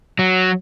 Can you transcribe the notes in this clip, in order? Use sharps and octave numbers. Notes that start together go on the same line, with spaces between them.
F#3